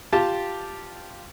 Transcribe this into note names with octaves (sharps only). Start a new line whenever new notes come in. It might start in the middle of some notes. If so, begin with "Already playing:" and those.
F4 G4 A5